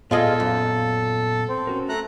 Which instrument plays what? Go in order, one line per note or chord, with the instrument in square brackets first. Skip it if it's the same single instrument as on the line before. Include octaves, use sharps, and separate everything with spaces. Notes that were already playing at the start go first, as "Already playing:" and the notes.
[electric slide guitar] A#2 B3 D5 [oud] F4 G#4 D#5 [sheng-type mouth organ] A4
[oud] F#2
[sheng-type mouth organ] C4
[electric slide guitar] C#4 F#4 A#4
[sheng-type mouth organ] A3 A#5 F#6